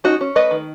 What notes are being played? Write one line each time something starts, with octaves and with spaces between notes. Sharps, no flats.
C#4 D#4 F#4
C#4
A3 B4 D#5
D#3